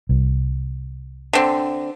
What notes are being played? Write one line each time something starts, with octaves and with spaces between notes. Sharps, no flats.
C2
D3 C4